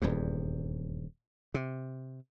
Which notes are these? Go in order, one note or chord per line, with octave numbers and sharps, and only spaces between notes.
D#1 E2 G2
C3